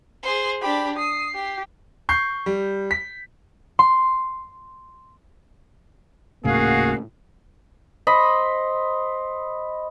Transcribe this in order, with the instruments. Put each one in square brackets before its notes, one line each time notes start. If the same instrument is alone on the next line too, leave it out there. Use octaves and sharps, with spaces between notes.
[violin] G#4 C5
[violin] D4 B5 [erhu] G4
[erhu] D#6 [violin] C7
[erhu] G4
[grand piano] C#6 G6 C7
G3
B6
[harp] C6
[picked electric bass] D#1 A2 C#3 [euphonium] A#3 [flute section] F#4 F5 [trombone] G#4
[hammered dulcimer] C5 D#5 B5